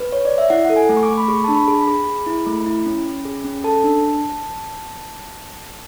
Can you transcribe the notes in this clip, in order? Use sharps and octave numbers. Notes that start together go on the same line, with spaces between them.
B4
C#5
D5
E5
E4 F#5
A4 F#5
G#5
A3
C#6
D6
A3
B5
G#4 C#6
D4 A5
B5
G#4
B5
G#4
G#4
E4
A3
E4
C#4
C#4
G#4
C#4
A4 A5
D4